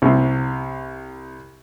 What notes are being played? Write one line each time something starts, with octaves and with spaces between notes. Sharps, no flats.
C2 C3